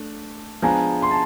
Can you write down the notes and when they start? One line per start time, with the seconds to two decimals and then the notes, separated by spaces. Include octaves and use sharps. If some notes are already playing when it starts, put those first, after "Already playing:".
Already playing: A3 D4
0.62 F3 G#3 B3 D4 G#5 A#5
1.02 C6
1.10 A5